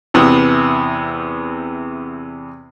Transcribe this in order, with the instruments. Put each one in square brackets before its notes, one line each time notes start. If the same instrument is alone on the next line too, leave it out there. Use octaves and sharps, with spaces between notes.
[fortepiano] E2 C3 B3